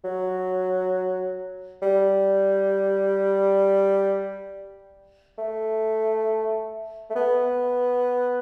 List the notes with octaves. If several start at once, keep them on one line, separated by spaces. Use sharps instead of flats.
F#3
G3
A3
A3
B3